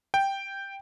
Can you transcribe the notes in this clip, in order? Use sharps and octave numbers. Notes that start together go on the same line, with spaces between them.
G5